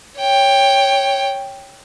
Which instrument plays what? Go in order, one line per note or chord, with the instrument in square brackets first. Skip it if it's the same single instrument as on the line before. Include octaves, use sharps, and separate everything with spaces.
[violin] C#5 G5